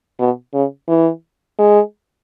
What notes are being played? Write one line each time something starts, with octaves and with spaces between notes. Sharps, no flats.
B2
C#3
E3
G#3